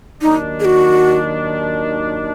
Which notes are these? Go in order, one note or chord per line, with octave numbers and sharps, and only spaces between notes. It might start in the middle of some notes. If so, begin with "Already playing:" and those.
D#2 D#3 F#3 D4 D#4
G#4
F#4